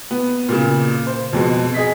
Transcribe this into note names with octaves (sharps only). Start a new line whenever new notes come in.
B3
A#2 C#3
C5
F2 B2 G#3
G#4 D#5 B6